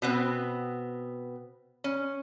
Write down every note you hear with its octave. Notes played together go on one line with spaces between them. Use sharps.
B2 B3 C4
C#4